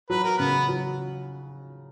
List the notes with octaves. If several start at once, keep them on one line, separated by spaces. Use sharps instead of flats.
F#3 B4
A#4
C#3 B3 B4
F#3